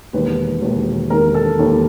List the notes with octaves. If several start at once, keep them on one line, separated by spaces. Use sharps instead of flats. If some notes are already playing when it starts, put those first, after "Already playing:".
E1 D#2 D#3 B4
E1 D#2 D#3
E1 D#2 D#3 A#4
A4
E1 D#2 D#3